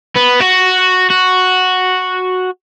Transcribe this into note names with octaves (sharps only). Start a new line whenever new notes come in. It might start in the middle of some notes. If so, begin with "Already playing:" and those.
B3
F#4
F#4